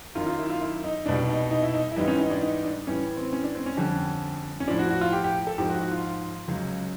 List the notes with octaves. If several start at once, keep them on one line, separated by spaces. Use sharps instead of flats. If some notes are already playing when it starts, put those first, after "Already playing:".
F#2 D#3 F#3 F4
F4
E4
F4
E4
D#4
C2 B2 G3 D4
D#4
D#4
E4
D#4
E4
G#2 E3 G3 D#4
C#4
D#4
D4
D#4
D4
A2 E3 G3 C#4
C4
C#4
D4
C4
C#4
F2 D3 G3
C#4
A2 F3 D4
F#4
F#4
F4
G4
G4
A4
G#2 F3 G4
F#4
F#4
F4
C#2 C#3 F#3